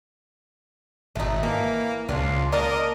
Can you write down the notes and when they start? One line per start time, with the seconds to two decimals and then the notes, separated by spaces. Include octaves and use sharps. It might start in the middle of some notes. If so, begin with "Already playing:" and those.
1.15 G#1 A3 D#4
1.43 E3 A#3
2.09 C#2 D4 F4
2.52 A#3 A#4 D5 D#5 A5